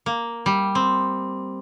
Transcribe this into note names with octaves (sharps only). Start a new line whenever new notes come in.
A#3
G3
C4